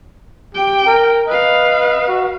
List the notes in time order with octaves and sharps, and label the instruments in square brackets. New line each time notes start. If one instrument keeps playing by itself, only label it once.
[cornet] G4 [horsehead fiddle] G5
[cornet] A#4
[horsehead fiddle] B4 F5 [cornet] D#5
[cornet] F#4